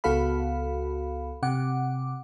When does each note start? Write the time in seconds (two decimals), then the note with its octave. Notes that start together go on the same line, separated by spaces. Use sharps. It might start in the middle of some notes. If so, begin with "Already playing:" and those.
0.04 C#2 B3 F#4 A4 F5 B5
1.43 C3 F#5 D6